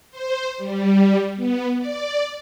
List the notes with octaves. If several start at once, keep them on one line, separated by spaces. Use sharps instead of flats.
C5
G3
B3
D5